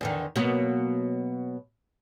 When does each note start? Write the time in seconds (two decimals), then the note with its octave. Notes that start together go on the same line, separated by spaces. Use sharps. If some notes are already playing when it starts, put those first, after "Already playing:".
0.01 E2 D3 D#3
0.36 B2 F#3 A#3